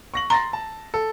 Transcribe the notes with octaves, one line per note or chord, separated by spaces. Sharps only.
C#6 A#6 F#7
A#5 C6 A6 A#6
A5
A4